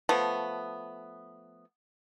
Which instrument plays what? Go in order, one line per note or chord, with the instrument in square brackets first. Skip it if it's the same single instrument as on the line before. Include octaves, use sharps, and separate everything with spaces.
[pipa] F3 A3 B3